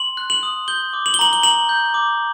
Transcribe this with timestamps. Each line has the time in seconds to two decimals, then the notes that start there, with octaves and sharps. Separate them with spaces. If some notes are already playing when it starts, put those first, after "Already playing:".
Already playing: C6 F#7
0.17 F#6
0.30 F#7
0.43 D#6
0.68 G6 G7
0.93 D6
1.06 F#7
1.14 G7
1.19 A#5 F#7
1.33 G7
1.43 A#5 F#7
1.69 G6
1.94 D6